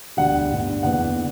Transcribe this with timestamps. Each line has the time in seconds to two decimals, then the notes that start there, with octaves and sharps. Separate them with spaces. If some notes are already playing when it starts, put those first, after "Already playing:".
0.17 E1 D2 D3 G3 D4 F#5
0.51 G1 G2 D3 A3
0.83 F#1 E2 D3 F#5
1.16 D3